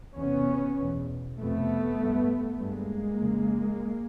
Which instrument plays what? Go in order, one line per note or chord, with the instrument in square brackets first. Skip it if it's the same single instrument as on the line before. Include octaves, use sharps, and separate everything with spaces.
[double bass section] E2 C3 B3 C#4
E2 B2
F2 C3 A3 B3
G2
G2 G#3 A#3
F2 C#3